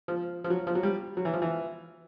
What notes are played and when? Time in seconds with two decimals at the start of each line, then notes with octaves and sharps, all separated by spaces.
0.08 F3
0.44 F3
0.50 F#3
0.67 F3
0.75 F#3
0.83 G3
1.17 F#3
1.25 E3
1.34 F3
1.42 E3